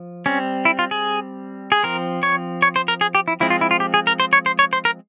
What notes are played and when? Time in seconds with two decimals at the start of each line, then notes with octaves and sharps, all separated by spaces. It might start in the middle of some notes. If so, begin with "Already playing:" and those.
Already playing: F3
0.26 G3 C4 C#4
0.65 E4
0.79 F4
0.91 G#4
1.72 G#4
1.83 F3 C4 A#4
2.23 C#5
2.62 C#5
2.76 C5
2.88 A#4
3.01 G#4
3.15 G4
3.28 E4
3.40 F3 G#3 C4 E4
3.50 F4
3.61 E4
3.71 F4
3.80 G4
3.94 G#4
4.07 A#4
4.20 C5
4.33 C#5
4.46 C5
4.59 C#5
4.73 C5
4.85 A#4